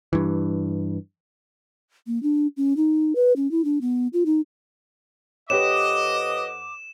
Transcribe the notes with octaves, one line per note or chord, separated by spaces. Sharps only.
G2 E3
A#3
D4
C#4
D#4
B4
C#4
E4
D4
B3
F4
D#4
F2 G4 B4 C#5 D#5 F#5 D6 E7